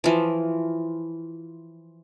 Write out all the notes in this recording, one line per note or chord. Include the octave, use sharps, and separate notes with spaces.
E3 F3